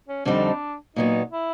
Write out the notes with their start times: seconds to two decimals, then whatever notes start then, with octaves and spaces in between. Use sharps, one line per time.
0.08 C#4
0.25 F2 D3 G3 C4 D4 D#4
0.96 A#2 F#3 B3 D#4
1.31 E4